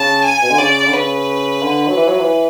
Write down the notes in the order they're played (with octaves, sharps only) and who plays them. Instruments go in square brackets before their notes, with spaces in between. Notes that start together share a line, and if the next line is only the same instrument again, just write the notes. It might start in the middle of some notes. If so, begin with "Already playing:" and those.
Already playing: [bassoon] C#3 [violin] A5
[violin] G#5
[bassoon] B2
D3
[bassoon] C#3 [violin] D5
[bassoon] D3
[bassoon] C#3 [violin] B4
[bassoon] D3
F#3
E3
F#3
E3